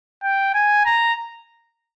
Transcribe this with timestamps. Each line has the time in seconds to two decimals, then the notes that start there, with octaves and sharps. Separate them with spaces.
0.23 G5
0.54 G#5
0.85 A#5